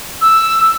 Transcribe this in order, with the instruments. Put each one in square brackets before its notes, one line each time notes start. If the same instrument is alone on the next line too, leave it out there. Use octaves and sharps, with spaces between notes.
[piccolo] E6